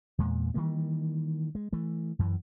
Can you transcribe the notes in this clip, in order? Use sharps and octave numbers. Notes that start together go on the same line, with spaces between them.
E2 A#2 G#3
D#3 E3 G3 A#3
G#3
E3 A3
F#2 E3